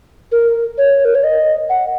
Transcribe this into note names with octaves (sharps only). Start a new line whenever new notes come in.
A#4
C#5
A#4
C#5
D#5
F#5